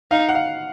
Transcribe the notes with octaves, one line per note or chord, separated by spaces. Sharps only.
D#4 F5
F#5
F5